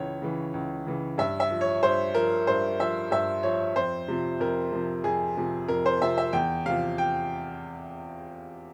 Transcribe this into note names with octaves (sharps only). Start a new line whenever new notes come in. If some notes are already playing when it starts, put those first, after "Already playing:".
Already playing: C#2 C#3 E3 C#5
C#3 E3
C#2
C#3 E3
G2 E5
E5
F3
C#5
G2 C5
F3 A#4
G2 C5
F3 E5
G2 E5
F3 C#5
F2 C5
C3 F3
F2 A#4
C3 F3
F2 G#4
C3 F3
F2 A#4
C5
C3 F3 E5
E5
E2 G5
C3 F3 F5
G5